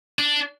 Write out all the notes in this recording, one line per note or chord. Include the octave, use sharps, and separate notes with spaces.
D4